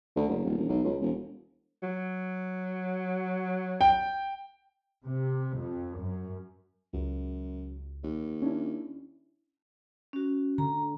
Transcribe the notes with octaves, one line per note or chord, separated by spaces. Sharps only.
D2
F#1
D#1
E1
B1
C#2
E1
F#3
G5
C3
F2
F#2
C#2 F#2
D#2
C#4 D4 E4
C#4 F#4
D3 A#5